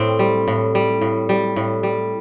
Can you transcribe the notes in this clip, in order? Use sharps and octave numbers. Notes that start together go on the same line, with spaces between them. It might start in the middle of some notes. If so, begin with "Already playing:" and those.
Already playing: A2 C4
G3
A2
G3
A2
G3
A2
G3